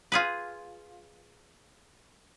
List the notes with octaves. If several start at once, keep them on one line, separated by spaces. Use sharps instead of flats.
F4 G#4 B4